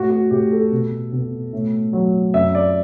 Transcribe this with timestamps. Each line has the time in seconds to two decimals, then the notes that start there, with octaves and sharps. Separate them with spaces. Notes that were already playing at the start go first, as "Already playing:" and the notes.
Already playing: A2 F#4
0.10 F#4
0.31 A2 G4
0.51 A4
0.71 B2
1.12 B2
1.53 A2
1.93 F#3
2.34 F#2 E5
2.55 D5